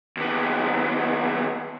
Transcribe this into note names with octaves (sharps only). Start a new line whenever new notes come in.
D#2 B3